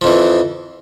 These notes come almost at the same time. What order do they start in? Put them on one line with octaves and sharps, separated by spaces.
F3 F2 E3